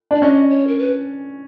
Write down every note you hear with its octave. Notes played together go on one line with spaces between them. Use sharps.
D4 D5
C#4 D#5
C#5
A#4
B4